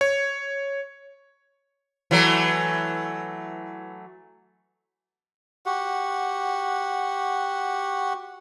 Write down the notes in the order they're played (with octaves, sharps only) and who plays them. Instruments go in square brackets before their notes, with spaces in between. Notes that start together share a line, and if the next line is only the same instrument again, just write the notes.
[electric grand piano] C#5
[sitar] E3 F#3 A3
[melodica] F#4 G4 F#5